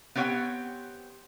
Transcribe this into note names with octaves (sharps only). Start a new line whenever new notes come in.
B3 C4 G4 C#5 E5 F#5